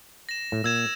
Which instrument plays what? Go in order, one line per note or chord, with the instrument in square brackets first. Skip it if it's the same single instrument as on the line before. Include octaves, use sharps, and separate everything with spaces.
[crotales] A#6 E7
[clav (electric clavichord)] A2
[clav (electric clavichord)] A#2 [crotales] E6 G#6 E7